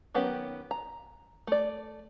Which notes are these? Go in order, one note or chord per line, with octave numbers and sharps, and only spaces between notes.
D#3 F#3 B3 C#4 G4
A#5
A3 D5